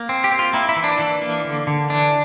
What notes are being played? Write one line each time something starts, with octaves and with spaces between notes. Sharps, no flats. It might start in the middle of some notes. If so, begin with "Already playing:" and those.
Already playing: A#3
C4
G4
C4
F4
A#3 E4
E4
E3
D4
E3
A#3
D3
D3
E3 D4